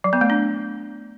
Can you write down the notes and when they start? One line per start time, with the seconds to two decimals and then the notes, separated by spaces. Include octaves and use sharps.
0.04 F#3
0.13 B3
0.21 A3
0.30 D4